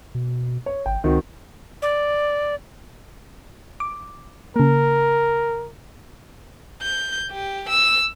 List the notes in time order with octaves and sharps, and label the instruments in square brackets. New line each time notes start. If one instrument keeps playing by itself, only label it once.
[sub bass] B2
[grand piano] C#5
[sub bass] G#1 [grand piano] G5
[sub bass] C#2 [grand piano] D#3 C4 F#4
[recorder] D5
[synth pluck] D6
[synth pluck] C#3 A#3 [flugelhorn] A#4
[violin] G6
G4
E6